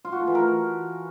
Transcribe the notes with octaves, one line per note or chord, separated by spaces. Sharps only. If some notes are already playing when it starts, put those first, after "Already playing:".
F4
F#4
A3
E3
A#4